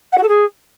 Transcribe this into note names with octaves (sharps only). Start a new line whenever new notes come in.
F#5
F#4
A4
G#4